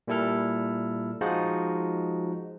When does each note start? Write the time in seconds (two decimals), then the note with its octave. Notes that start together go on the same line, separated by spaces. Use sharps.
0.08 A#2 G3 E4 A4 F6
1.21 F3 G#3 D#4 F4 F#4